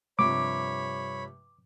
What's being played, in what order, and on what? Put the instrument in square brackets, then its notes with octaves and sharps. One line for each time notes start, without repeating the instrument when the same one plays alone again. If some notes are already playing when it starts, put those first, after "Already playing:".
[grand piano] G2 C3 F3 [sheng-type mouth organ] C#5 B5 [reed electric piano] D6